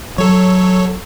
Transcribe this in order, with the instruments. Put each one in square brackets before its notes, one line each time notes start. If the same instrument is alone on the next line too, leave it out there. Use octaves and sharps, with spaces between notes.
[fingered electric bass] F#3 [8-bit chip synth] A4 C#5